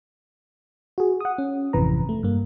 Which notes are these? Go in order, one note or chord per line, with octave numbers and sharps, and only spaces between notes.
F#4 G#4
F#5 D#6
C#4
G#1 F2 C3 E3 B4 A#5
A3
G2 A#3